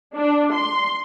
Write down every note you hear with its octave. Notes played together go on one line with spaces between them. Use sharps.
D4
C6